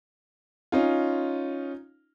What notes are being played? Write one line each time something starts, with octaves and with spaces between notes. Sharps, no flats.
C#4 D#4 F4